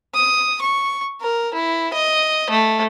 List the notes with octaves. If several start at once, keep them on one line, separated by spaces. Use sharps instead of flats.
D#6
C#6
A#4
E4
D#5
A3